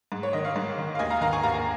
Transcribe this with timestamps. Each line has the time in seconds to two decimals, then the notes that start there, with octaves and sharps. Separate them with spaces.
0.12 G#2
0.23 C#5
0.33 D#3 D#5
0.44 C#5 F5
0.56 G#2
0.78 D#3
0.95 F5
0.99 D#2 D#5 G#5
1.10 F5 A#5
1.21 D#3 F5 A#5
1.33 G#5 C#6
1.43 D#2 F5 A#5